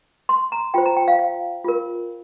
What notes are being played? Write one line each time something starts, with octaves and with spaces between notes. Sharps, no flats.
C6
A#5
F4 C5 G5
A#5
G5
F5
F5
F4 A#4